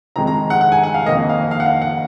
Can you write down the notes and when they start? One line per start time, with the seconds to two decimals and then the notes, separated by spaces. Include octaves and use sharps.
0.16 F2 D#3 G#3 C4 A#5
0.27 A#5
0.50 F#5
0.61 F#5
0.72 G#5
0.83 F#5
0.94 F5
1.06 F2 D#3 A#3 D#5
1.29 F5
1.51 F5
1.60 F#5
1.66 F5
1.82 F#5